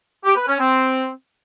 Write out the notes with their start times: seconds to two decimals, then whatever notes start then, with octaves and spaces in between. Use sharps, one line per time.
0.24 G4
0.36 B4
0.48 C#4
0.59 C4